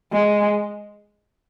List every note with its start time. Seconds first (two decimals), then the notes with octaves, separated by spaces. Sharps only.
0.12 G#3